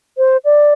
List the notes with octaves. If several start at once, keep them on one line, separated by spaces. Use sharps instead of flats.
C5
D5